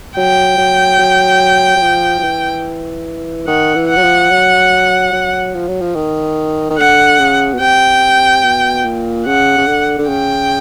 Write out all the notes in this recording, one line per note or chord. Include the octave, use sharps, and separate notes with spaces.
F#3 G5
F#3
F#3
F#3
F3
F3
E3
D#3 F#5
E3
F#5
F#3
F3
F#3
F#3
F3
F#3
F3
D#3
D#3
D3 F#5
C#3
B2
C3 G5
B2
A#2
C#3 F#5
C#3
D3
D3
C#3 G5